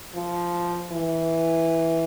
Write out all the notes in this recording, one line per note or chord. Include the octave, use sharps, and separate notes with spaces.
F3
E3